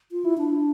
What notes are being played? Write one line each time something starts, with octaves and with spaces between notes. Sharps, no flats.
F4
E4
D4